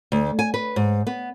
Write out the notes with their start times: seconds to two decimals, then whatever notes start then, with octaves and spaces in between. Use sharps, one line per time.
0.12 D2
0.39 G#5
0.54 B4
0.76 G#2
1.07 B3